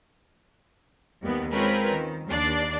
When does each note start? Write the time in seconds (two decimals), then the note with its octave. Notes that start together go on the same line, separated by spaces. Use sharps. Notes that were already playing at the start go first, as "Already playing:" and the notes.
1.22 D#2 G3 B3
1.52 G#3 C4 C#4 F4 A#4 B4
1.95 D#3
2.29 D#2 D4 D5 C7